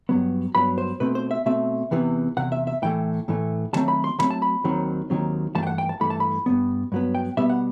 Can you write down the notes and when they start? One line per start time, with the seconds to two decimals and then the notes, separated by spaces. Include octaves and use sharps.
0.09 G2 F#3 B3
0.55 G2 F#3 B3 B5
0.78 C5
1.00 B2 A3 C4 B4
1.15 C5
1.31 E5
1.46 B2 A3 C4 E5
1.91 E2 C3 E3 B3
2.37 E2 C3 F#5
2.52 E5
2.67 E5
2.82 A2 E3 A3 G5
3.28 A2 E3 A3
3.73 D#2 D#3 F#3 A3 C4 A5
3.88 B5
4.04 C6
4.19 D#2 D#3 F#3 A3 C4 B5
4.31 A5
4.42 B5
4.64 D#2 D#3 F#3 C4
5.10 D#2 D#3 F#3 C4
5.55 G2 E3 A3 A5
5.63 G5
5.67 F#5
5.78 G5
5.89 A5
6.01 G2 E3 A3 B5
6.10 A5
6.20 B5
6.46 G2 F#3 B3
6.92 G2 F#3 B3
7.15 G5
7.37 B2 G3 B3 E5
7.49 F#5